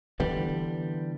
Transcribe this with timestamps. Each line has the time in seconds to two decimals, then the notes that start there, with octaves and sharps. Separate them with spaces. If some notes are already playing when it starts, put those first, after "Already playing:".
0.20 D3 E3 G3 B3